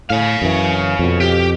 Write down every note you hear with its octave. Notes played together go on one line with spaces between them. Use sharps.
A2 C#5 F5
F#2 E3
F2 B2
G4